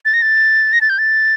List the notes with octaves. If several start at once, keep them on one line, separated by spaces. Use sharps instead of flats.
A6
A#6
A6
A#6
A6
G6
A6